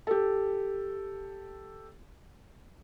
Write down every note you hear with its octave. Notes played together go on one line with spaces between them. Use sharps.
G4 A4